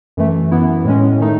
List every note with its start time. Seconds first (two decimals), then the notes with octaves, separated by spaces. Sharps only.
0.17 F#2 E3 A3
0.51 F#2 E3 B3 E4
0.85 A2 G#3 C#4
1.19 D#3 A3 D#4